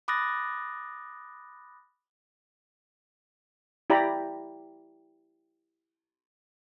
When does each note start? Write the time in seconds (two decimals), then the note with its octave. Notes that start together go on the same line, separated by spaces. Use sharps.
0.08 B5 D6 D#6 F#6 A6 A#6
3.90 E4 G4 D5 A#5 B5